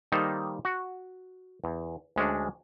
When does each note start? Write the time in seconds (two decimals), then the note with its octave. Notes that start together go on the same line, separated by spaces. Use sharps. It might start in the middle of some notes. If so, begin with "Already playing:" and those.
0.12 D#3 G3 A#3 D#4 A4 C5
0.65 F#4
1.64 E2
2.16 D2 G#3 C#4 D4